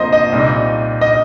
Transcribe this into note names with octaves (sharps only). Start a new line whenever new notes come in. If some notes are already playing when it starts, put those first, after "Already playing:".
Already playing: F2 F3 A#3 C5 D#5
D#5
C2 A#2 G3 C4 D#4
D#5